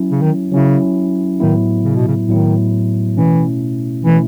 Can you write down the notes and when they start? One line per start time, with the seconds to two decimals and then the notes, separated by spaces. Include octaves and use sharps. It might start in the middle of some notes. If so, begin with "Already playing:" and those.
Already playing: F#3 C#4 E4
0.11 C#3
0.22 D#3
0.51 C#3 F#3 C#4 E4
1.40 A2 D#3 F#3 B3 E4
1.84 C#3
1.96 B2
2.08 C#3
2.28 A2 D#3 F#3 B3 E4
3.17 B2 E3 A3 C#4 E4
4.05 B2 E3 A3 C#4 E4